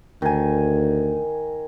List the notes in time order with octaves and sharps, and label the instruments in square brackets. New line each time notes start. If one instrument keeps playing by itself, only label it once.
[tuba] D2 [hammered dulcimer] D#3 G#5